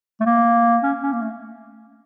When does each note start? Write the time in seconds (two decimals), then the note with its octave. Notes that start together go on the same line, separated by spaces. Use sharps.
0.20 A3
0.26 A#3
0.83 C#4
1.03 C#4
1.13 A#3
1.22 A3